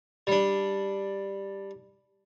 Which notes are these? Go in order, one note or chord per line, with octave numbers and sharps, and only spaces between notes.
G3 D4